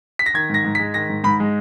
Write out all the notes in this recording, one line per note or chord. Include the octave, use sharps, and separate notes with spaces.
B6
A#6
D#3 G#6
G#2 A#6
G#2
B6
G#3
D#3 A#6
G#2
G#2 B5
G#3